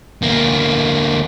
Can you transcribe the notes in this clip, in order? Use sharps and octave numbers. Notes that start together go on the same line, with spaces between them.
D2 A#3